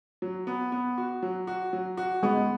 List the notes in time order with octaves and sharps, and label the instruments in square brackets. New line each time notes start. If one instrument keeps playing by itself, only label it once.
[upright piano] F#3
B3
B3
F#4
F#3
F#4
F#3
F#4
[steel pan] G#3 [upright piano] B3